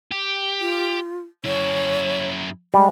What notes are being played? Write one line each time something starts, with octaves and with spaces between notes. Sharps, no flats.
G4
F4
F#2 E4 C#5
G3 G#3